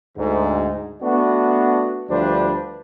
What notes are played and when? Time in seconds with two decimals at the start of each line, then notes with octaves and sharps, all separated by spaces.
0.18 D2 G#2
1.02 A3 B3 D4 F#4
2.10 D2 F3 G3 D4 B4 C5